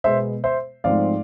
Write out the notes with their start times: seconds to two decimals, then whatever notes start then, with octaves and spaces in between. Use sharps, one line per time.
0.04 B2 G#3 B3 C5 E5
0.44 C5 E5
0.84 G#2 F3 A3 C4 D5 F5